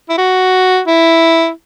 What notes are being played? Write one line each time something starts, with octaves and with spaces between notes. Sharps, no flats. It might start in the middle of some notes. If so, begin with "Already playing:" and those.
E4
F#4
E4